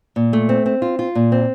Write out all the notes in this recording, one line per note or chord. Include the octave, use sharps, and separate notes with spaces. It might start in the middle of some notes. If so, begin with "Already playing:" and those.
A#2
A3
C4
C4
F4
F4
A#2
C4